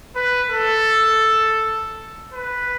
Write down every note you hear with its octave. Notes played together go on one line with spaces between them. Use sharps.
B4
A4
B4